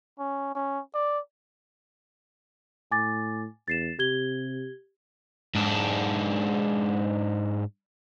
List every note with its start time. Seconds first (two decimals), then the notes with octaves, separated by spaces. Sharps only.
0.19 C#4
0.55 C#4
0.94 D5
2.91 A2 G#5 D6 A6
3.68 E2 A6 C7 E7
3.99 C3 G4 G#6 G7
5.55 G#2 D4